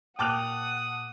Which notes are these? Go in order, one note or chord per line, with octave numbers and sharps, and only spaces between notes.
A#2 F#5 G5 A5 D6 D#6 F#6 F7